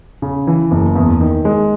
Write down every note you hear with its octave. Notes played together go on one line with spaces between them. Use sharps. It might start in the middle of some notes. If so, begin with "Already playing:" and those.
C#3
E3
F#1
E2
D#3
G#3